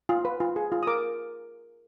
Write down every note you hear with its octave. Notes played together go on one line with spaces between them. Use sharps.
F4
B4
F4
G#4
F4
D#6
A#4 D6